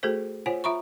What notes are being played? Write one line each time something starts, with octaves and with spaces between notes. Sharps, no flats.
A3 F#4 G#4 A4 C5
F4 C5 C#5 F#5 G#5
F4 E5 A#5 B5 C#6